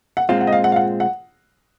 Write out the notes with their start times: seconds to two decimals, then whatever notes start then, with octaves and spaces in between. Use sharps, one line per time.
0.17 F#5
0.29 A#2 G#3 C4 F4 F5
0.41 F#5
0.47 D#5
0.52 F5
0.64 F#5
0.72 F5
0.76 F#5
1.00 F#5